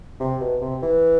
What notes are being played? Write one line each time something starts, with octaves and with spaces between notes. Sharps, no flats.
C3
B2
C3
E3